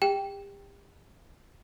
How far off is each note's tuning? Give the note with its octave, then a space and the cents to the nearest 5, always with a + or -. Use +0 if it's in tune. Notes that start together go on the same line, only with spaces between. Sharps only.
G4 +35 G5 +0